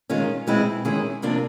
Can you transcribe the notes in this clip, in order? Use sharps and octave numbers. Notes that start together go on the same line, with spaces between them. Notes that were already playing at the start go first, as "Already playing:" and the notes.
D#3 G#3 C#4 F4
B2 G#3 C4 E4
D#3 G#3 C#4 E4 G#4
C3 F3 A#3 D4